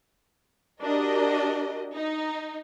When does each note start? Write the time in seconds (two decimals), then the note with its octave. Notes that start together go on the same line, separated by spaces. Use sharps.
0.81 D4 F#4 G4 A#4 D#5
1.94 D#4